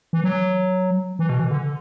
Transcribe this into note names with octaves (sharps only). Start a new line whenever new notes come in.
E3
F#3
E3
B2
E3
D3